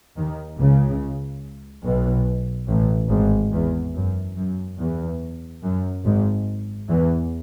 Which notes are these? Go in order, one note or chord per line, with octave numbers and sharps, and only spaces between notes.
D#2 D#3
C#2 C#3
B1 B2
A1 A2
G#1 G#2
E2
F#2
F#2
E2
F#2
G#1 G#2
E2 E3